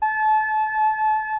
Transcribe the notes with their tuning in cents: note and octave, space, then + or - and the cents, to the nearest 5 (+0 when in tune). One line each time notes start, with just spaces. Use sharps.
A5 -30